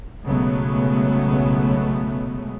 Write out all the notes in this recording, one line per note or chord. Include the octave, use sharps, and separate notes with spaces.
B1 C#3 F#3 G#3 A3 B3